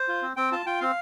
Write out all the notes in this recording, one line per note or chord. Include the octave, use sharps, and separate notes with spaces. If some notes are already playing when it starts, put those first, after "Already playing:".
Already playing: C5
F4
C4
C4 G5
F4 A5
F4 G5
C4 F5